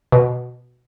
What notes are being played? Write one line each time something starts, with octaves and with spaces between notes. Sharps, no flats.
B2